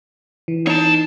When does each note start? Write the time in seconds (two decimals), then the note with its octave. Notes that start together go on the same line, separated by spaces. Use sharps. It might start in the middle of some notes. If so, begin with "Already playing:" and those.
0.48 E3
0.67 D#4 C#5 A5